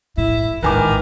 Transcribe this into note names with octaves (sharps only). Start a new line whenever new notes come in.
A2 E4
A1 G#2 D#3 B4 G#5 D6